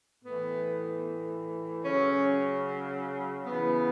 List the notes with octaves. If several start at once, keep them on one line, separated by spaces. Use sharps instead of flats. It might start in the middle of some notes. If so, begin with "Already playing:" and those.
A2 E3 B3
C#3 F#3 C#4
C#3 E3 B3